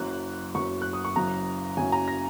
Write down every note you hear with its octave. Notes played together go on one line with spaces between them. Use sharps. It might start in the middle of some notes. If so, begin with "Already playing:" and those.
Already playing: F#1 F#2 F#3 F#6
F#1 F#2 F#3 C#6
F#6
D#6
C#6
F#1 F#2 C#3 F#3 A#5
F#1 F#2 C#3 F#3 G#5
A#5
A#6